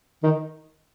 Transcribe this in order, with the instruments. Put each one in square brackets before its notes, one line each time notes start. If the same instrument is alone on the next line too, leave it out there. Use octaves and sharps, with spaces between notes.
[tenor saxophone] D#3